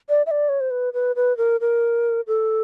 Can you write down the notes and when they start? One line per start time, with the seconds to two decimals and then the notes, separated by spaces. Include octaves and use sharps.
0.09 D5
0.26 E5
0.31 D5
0.49 C#5
0.60 C5
0.71 B4
0.94 B4
1.16 B4
1.37 A#4
1.61 A#4
2.27 A4